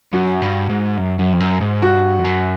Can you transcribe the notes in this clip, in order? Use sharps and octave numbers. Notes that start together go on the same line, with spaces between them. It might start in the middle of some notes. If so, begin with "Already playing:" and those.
F#2 F#4
G2
G#2
F#2
F#2
F2
F#2
G#2
G2 F#4
F2
F#2